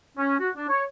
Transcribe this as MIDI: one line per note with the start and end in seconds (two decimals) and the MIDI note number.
0.17 0.35 61
0.40 0.50 66
0.56 0.69 62
0.69 0.83 73